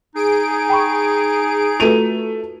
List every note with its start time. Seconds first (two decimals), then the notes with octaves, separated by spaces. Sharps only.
0.15 D#4 G#4 D7
0.69 G5 B5 C#6
1.80 A3 F4 F#4 B4 D#7 F7